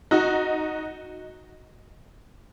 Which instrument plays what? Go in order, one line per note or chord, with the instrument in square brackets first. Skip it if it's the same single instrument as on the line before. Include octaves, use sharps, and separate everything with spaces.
[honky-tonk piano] D#4 F#4